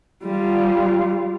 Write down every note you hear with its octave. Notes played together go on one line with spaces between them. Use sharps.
G3 F4